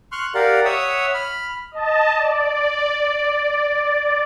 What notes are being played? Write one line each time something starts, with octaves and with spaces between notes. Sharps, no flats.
C6 C#6 F6 F#6
G4 A#4 D5 F5 F#5
C#5 E5 F#5 D#6 E6
B5 F6
D#5 A5
D5